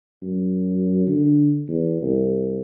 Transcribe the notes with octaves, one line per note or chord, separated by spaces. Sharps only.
F#2
D3
E2
C2